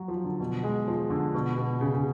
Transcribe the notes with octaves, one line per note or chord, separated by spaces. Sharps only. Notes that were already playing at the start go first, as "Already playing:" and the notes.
Already playing: F#3
F3
D3
B2
G#3
F3
D3
B2
B2
C#3
C#3